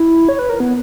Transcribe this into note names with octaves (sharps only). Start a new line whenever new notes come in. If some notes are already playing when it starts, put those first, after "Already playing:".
Already playing: E4
C#5
B4
A#4
B3